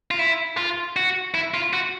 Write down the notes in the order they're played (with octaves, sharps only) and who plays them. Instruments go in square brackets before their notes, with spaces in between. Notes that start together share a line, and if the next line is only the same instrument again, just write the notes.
[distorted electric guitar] F4
E4
F4
F#4
E4
F4
F#4